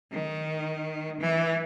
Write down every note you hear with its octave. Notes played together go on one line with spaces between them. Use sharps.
D#3
E3